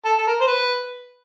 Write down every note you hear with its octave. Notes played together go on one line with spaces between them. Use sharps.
A4
A4
A#4
C5
B4